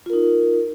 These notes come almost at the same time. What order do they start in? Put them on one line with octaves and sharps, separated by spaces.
F4 A#4 D#4